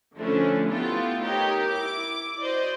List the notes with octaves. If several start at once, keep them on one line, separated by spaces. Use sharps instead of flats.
D3 F3 A3 C#4 D4 E4
A3 B3 E4 F4 G4 A4
D#4 G4 A#4 C#5
E4 D6
F#4 C5 D5 D#5